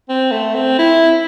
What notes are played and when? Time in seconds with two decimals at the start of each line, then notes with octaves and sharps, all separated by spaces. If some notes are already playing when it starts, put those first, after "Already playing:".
0.09 C4
0.32 A3
0.55 C4
0.79 E4